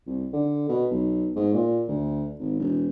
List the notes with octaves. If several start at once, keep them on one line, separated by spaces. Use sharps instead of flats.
C2
D3
B2
B1
G#2
A#2
D2
G#1
E1